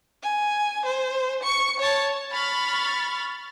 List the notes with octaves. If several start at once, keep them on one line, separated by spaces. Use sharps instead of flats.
G#5
C5
C#6 C#7
C#5 A5
B5 C#6 F6 A6